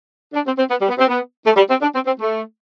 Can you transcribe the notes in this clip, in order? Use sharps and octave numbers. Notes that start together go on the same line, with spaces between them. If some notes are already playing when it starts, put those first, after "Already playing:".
D4
C4
C4
B3
G3
B3
C4
B3
A3
G3
C4
D4
C4
C4
A3